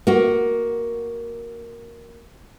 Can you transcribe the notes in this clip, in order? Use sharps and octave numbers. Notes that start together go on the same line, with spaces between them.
A#3 F#4